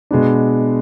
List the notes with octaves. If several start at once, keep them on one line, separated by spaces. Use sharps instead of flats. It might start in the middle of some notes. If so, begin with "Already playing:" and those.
B2 G#3 B3 D4